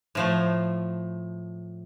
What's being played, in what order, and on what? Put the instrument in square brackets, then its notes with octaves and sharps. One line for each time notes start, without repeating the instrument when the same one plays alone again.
[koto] A2 F3 A3